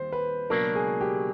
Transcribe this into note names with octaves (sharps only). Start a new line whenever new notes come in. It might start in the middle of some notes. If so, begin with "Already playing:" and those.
Already playing: D#2 D#3 G3 C4 C5
B4
C#2 B2 F#3 A#3 D4 A#4
G#4
G4